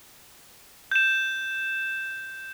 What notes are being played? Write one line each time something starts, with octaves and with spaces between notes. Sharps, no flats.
G6 E7